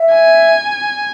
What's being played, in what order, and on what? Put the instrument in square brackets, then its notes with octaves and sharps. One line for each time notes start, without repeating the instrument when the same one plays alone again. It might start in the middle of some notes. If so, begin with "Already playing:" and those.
Already playing: [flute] E5
[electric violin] G#5